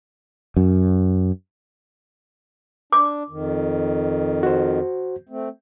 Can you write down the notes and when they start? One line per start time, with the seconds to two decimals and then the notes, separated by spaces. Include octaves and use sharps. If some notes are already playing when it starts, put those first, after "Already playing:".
0.57 F#2
2.93 D4 D6
3.30 F2 D#3
4.43 F#4 C5
5.29 A3 C4